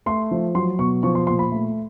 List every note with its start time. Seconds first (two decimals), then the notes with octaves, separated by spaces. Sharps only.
0.06 A3 C6
0.31 F3
0.55 F#3 C6
0.79 B2 C#6
1.03 F3 C#6
1.15 C6
1.27 A#2 C6
1.39 B5
1.52 A3